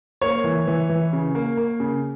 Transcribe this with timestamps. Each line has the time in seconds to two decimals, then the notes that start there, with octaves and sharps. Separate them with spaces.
0.21 A#3 C#5
0.44 E3
0.67 E3
0.89 E3
1.13 C#3
1.35 A#3
1.57 A#3
1.80 C#3